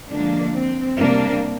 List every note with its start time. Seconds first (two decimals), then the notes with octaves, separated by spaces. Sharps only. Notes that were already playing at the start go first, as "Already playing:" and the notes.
0.11 D3 F3 G#3 A#3 D4
0.55 C4
0.99 C3 G3 A#3 D4